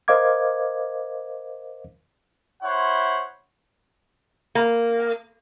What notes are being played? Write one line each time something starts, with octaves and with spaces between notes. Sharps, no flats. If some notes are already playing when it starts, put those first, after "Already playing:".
A#4 C5 D#5 F5 D6 G#6
E4 C5 C#5 F#5
A#3